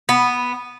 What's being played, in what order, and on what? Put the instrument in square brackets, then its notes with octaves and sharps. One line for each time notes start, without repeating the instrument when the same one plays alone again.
[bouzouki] B3